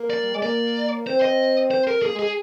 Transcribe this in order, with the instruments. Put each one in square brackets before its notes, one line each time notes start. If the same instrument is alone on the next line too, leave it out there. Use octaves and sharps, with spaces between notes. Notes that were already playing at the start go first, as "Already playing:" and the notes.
Already playing: [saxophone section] A#3
[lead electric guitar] D5
[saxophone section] G3
G#3
[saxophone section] A#3 [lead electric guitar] D5
[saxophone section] C4 [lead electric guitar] C5
[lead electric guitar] D#5
C5
A#4
[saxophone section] A#3 [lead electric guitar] G#4
[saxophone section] G#3
[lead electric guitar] G#4